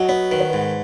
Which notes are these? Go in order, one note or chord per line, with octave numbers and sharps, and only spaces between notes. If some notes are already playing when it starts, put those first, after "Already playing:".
Already playing: F#3 D#5
B3 C#5
D#3 B4
C#5
G#2 B4